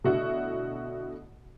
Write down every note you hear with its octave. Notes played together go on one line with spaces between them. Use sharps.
B2 D3 A3 E4 F#4